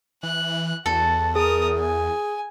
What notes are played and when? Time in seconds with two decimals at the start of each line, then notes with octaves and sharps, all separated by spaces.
0.23 E3 F#6
0.86 E2 F#4 A4
1.36 G#4 A#4 D#6
1.79 G#5